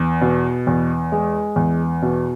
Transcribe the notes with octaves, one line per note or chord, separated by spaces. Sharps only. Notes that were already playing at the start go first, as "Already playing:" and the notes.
Already playing: E2
B2
E2
G#3
E2
B2